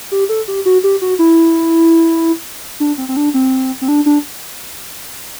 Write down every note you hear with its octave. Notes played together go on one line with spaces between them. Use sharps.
G4
A4
G4
F#4
G4
F#4
E4
D4
C4
C4
D4
C4
C4
D4
D4